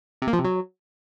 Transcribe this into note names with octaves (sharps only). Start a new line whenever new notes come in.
C3
A#3
F3
C3
F#3